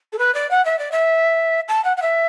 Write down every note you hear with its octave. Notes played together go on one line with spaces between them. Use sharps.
A4
B4
D5
F#5
E5
D5
E5
A5
F#5
F#5
E5